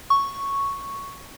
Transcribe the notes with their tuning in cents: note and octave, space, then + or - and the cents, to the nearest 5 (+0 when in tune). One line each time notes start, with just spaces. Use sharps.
C#6 +0